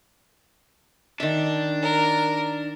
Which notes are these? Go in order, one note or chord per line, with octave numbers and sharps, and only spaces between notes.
D#3 D4 E5
A#4